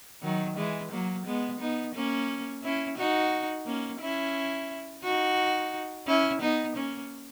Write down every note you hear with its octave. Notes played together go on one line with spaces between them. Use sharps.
D#3 F#3
E3 G#3
F#3 A#3
G#3 B3
B3 D#4
A#3 C#4
C#4 E4
D#4 F#4
A#3 C#4
C#4 E4
D#4 F#4
C#4 E4
B3 D#4
A#3 C#4